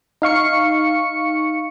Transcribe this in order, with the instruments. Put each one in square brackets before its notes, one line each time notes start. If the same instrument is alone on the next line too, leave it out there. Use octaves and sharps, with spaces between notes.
[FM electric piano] D#4 F5 C#6 C#7